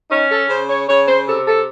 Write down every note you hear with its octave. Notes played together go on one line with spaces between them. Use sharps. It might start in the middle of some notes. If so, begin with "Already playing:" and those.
C#4 D#4
A4
C#3 C5
C#5
C#3 C#5
C5
C3 A4
A4